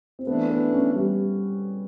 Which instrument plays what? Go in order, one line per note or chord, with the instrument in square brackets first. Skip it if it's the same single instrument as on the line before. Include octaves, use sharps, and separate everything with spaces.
[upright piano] C4
[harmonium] E3 A3 D4 [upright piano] B3
[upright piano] B3
C#4
G3